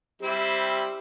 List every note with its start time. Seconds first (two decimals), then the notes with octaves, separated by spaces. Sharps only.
0.22 G3 C4 E4 G4